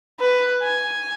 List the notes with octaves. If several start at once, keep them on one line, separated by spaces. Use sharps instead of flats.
B4
G#5